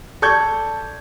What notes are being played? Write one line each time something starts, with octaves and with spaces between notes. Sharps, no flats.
A4 D5 C#6 G6 G#6